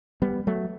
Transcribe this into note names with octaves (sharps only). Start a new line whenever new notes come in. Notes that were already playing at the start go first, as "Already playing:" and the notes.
G3 B3
F#3 A3